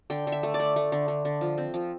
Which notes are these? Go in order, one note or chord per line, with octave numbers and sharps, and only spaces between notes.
D3 G5
D3
E5
A3
D5
A3
A3
D3
D3
D3
F3
C4
F3